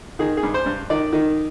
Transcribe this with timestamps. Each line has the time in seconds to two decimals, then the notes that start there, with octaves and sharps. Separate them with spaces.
0.19 D#3 G#4
0.37 G#4
0.43 G2
0.54 C5
0.66 G2
0.90 D#3 D5
1.13 D#3